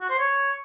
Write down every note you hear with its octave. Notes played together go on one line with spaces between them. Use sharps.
F#4
C5
C#5